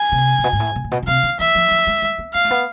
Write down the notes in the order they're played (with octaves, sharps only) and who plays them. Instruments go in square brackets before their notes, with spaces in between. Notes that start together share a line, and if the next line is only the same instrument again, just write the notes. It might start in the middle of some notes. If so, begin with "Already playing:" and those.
Already playing: [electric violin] G#5
[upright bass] C3
A2
B2
G#2
A2
B2
A2
B2
B2
[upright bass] C3 [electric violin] F5
[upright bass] D3
[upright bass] E3 [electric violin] E5
[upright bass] F3
F3
G#3
G#3
B3
[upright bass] B3 [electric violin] F5
[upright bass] A3
B3